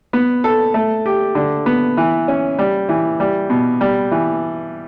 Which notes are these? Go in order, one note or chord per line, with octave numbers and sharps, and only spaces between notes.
B3
A4
A3
G4
D3
B3
E3
C#4
G3
E3
G3
B2
G3
E3